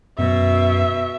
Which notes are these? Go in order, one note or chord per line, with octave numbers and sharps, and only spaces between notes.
F#2 B2 E5